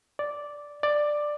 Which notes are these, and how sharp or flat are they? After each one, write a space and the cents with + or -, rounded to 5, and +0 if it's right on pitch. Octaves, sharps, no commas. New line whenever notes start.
D5 -5
D5 +10